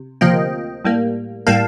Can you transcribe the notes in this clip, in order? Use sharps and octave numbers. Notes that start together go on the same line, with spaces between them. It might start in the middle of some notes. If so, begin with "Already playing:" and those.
Already playing: C3
D2 C3 F3 A#3 D#5 G5
A2 G3 A#3
A2 G3 A#3 F5 A5